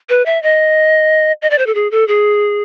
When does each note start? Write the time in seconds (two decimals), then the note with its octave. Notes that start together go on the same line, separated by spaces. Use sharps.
0.09 B4
0.26 E5
0.43 D#5
1.42 D#5
1.50 D5
1.58 C5
1.66 A4
1.75 G#4
1.91 A4
2.08 G#4